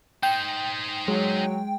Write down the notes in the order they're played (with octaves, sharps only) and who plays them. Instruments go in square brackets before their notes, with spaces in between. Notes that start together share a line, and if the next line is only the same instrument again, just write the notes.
[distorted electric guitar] D#4 C5 [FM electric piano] G5
[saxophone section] F#3 [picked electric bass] G#3